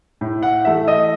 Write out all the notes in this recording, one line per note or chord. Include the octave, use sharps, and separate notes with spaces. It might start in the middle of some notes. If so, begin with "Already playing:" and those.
A2
F#5
E3 A3 E5
D#5